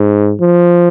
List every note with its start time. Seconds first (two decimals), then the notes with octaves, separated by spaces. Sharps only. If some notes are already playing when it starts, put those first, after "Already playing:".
Already playing: G#2
0.41 F3